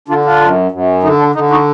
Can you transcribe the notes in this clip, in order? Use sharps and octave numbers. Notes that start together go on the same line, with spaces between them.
D3 D4 F4
D4 F4
F#2
F#2
D3 D#4
D4
D3 D#4
D#4 F#4